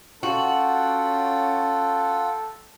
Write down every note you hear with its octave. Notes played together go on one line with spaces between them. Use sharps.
C#4 F4 F#4 A4 F#5 G5